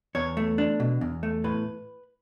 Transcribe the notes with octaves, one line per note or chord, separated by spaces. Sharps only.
E2 C#5
A3
D4
B2
E2
A3
A2 B4